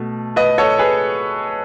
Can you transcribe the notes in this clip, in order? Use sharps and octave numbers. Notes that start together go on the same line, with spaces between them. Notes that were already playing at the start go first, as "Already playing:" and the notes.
Already playing: B2 A3
B4 D#5
A4 C#5
G#4 B4